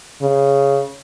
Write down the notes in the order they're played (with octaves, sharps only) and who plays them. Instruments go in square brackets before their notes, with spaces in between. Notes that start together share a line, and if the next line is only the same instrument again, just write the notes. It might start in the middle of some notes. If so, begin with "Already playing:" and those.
[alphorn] C#3